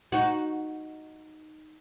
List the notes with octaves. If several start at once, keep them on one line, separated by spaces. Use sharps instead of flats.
D#4 F#4